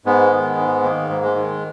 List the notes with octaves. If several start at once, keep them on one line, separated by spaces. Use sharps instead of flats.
G#2 G#3 B3
D#3
G#2
D#3 A#3
G#2
G#3
D#3